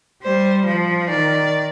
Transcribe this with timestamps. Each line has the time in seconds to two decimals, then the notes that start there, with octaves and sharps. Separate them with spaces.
0.23 G3 C5
0.66 F3
1.09 D#3 D5